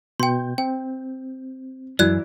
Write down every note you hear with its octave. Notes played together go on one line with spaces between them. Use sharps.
B2 G5 C6 G6
C4 G5
F#2 E3 F#3 E4 D5 F#6 G#6